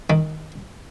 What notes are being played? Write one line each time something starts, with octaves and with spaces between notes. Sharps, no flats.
D#3